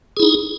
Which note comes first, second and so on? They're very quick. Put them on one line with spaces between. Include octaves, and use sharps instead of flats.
G#4 E4 D#4